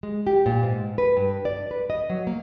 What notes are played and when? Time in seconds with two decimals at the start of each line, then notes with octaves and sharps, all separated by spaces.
0.03 G#3
0.27 G4
0.46 A#2
0.63 G#2
0.98 B4
1.17 G2
1.45 D5
1.71 B4
1.90 D#5
2.10 F#3
2.27 A#3